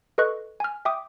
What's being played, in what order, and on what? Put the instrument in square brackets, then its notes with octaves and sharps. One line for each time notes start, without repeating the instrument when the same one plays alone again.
[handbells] A4 B4 D#5 C#6 F#6
G#5 F6
E5 G5 D6 D#6